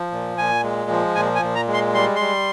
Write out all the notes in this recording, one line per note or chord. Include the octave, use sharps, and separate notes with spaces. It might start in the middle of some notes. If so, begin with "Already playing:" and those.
Already playing: F3
A#2
A#2 G#5
G#3
F3
A#2 G#5
G#5
A#2
A#5
G#3
C6
G3 C6
G3 C6